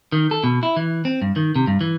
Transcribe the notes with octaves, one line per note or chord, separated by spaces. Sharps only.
D#3
A4
B2
E4
E3
C4
G2
D#3
C3
G2
E3